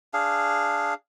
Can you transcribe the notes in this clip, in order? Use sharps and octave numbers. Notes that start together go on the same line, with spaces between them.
D4 G#4 F5